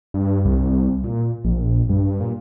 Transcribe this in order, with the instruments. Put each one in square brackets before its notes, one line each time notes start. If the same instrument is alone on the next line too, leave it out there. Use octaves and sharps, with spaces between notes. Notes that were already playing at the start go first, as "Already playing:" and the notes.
[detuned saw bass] G2
C2
A#2
A#1
G2
A#2